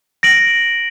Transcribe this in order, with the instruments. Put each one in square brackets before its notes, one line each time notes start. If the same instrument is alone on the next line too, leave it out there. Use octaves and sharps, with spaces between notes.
[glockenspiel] A#6 D7 F#7